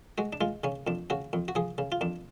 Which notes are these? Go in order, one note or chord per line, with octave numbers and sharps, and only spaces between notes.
G#3 F#4
D4
G#3 F4
C#3 C#4
F2 D4
C#3 F#4
F2
F#4
F3 G#4
C#3
F4
F2 D4